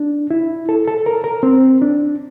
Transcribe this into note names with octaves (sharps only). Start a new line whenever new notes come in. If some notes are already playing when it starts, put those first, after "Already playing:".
Already playing: D4
E4
A4
A4
A#4
A#4
C4
D4